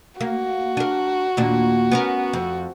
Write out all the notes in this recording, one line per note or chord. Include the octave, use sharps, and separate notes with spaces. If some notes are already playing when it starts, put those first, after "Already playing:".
A#3 F#4
D4 A#4
D#2 A#2 D4
B3 C#4 A#4
F2